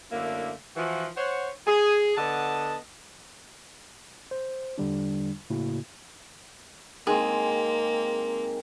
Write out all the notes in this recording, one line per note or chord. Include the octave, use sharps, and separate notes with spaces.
F#2 D3 A3 A#3 D4 E4
E3 F3 F#4
C5 C#5 F#5
G#4
D3 B3 D#5 A5
C5
E2 D3 G3 D4
A2 C#3 A#3 E4 F#4
D#3 G#3 A#3 C4 G#4